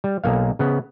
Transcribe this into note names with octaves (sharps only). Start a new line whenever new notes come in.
G3
B1 A#3 F5
C#3 B3